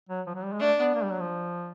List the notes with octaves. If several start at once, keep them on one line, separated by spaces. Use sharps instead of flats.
F#3
F3
F#3
G3
G#3
A3 D4
B3
A#3
G3
F#3
F3